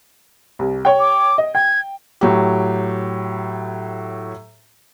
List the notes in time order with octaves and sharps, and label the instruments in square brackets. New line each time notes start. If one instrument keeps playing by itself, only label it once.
[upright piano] C2
C#5 G5
[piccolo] D6
[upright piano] D#5
[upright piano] G5 [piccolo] G#6
[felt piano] A2 F#3 G4